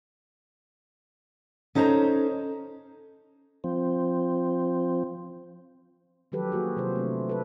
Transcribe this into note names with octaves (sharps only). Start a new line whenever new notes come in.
C#4 D#4 A4 C5 C#5 A#5
F3 C4
D#3 F3 F#3 G4 A4 B4
A#3 F#4 G#4
C3 F#3 F4 C5
A3 D4
A4 B4